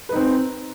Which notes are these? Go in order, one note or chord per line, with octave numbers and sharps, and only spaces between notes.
C4 D#4 B4